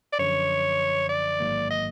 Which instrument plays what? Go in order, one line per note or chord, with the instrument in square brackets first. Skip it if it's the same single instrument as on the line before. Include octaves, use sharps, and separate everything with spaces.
[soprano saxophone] D5
[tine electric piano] F#2 D3 F3 [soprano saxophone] C#5
[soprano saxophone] D5
[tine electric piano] A1 G#2 D#3 F#3 A#3
[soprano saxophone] D#5